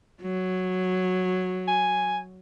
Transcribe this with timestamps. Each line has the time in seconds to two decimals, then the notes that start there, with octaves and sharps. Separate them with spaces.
0.22 F#3
1.68 G#5